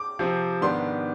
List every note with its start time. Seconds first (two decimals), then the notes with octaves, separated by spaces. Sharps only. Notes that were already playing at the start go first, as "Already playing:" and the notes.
Already playing: D6
0.19 C3 F3 C4
0.62 G#2 D#3 B3 D4 C6